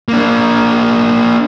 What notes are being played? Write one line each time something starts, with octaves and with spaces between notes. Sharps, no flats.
A#3 D4